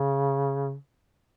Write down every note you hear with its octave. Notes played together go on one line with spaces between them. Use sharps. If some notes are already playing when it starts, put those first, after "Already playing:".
Already playing: C#3